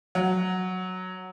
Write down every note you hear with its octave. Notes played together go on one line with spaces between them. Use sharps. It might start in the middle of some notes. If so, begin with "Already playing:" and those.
F#3